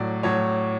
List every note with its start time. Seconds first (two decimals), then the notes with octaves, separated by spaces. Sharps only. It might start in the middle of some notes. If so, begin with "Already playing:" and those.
Already playing: A2 F#3 D5
0.23 A2 F#3 C#5